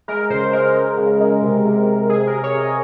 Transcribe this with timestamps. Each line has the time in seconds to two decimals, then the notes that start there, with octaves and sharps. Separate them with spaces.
0.08 G#3 A#4
0.30 C#3 C5
0.53 G#3 A#4
0.75 G#3
0.97 C#3
1.20 G#3
1.42 C3
1.65 C3
1.88 C3
2.09 C3 G#4
2.27 C3 A#4
2.43 C#5
2.55 C3
2.60 D#5